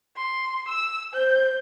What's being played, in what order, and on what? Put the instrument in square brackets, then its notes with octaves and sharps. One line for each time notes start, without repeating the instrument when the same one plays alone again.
[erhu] C6
E6
[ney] C5 [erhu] G6